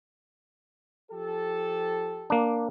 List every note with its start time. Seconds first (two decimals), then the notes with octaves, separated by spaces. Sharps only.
1.11 F3 G4 A4
2.30 A#3 D4